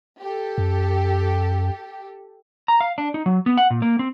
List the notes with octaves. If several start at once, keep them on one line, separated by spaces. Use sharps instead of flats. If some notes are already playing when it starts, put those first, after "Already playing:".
G4 A4
F#2
A#5
F5
D4
D#4
F#3
B3
F#5
A#2
A#3
C4